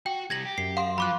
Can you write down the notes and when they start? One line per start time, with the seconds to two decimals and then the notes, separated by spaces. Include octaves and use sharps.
0.06 F#4 G5
0.30 C3 G3 G#6 A#6 F#7
0.45 G4
0.58 F#2 C7
0.77 F5 F#5 C6
0.98 F3 B5 D6 F#6